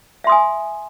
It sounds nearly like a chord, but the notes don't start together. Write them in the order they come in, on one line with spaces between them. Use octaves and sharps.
E5 C6 D#6 G#5